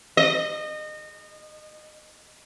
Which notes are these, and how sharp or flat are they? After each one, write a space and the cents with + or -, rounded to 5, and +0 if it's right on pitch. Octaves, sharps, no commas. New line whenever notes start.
D#5 -25